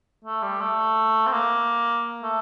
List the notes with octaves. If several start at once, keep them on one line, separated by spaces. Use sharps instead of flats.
A3
G3
A3
C4
A#3
A3